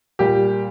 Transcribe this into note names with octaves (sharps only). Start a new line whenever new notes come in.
A#2 G3 G4